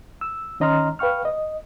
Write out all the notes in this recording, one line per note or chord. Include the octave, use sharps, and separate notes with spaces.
E6
D#3 C#4 D#5 A#5 C6 F6
B4 F5 G5 C#6 F6
D#5